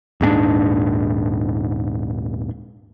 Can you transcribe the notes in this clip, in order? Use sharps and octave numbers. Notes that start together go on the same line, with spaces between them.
D#1 G#2 C4 D4